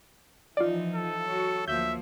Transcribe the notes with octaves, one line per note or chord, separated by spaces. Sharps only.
E3 F3 D#4 F4 D5
A4
F#3 F#4
D2 F3 A#3 E5 G6